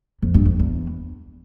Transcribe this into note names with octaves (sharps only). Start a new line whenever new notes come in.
F2
G2
F2
E2